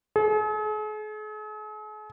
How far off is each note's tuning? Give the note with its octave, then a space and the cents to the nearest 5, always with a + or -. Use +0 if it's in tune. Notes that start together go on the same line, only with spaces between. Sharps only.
G#4 +45